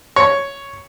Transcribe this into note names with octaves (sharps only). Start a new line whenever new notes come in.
C#5